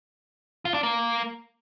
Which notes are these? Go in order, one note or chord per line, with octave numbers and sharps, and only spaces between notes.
F4
D4
A#3